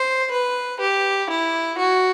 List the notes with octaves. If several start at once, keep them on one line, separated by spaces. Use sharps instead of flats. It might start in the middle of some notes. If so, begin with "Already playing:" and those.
Already playing: C5
B4
G4
E4
F#4